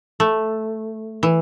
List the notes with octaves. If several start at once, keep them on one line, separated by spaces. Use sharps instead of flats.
A3
E3